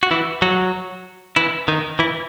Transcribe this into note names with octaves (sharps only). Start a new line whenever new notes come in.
F#4
E3 E4
F#3 F#4
E3 E4
D#3 D#4
E3 E4